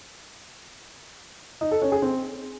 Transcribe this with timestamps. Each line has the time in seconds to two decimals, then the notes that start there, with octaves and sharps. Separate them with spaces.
1.61 D#4
1.71 A4
1.82 C#4
1.92 G#4
2.02 C4